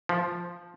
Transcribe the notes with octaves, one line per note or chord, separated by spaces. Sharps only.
F3